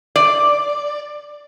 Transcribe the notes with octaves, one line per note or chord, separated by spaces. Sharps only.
D5